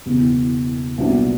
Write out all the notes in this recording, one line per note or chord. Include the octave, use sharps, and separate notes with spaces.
F#1 E2 B2
C2 A#2 F#3 B3 D4